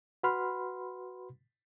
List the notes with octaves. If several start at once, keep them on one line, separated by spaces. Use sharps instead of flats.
F#4 B4 F#5 B5 C6 F6